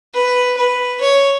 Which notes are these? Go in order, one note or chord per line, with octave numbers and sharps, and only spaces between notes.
B4
B4
C#5